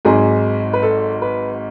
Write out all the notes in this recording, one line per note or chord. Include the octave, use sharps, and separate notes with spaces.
G#1 G#2 F#3 G#4
B4
A4
B4